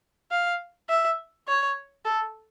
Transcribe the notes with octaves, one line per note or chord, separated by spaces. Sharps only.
F5
E5
C#5
A4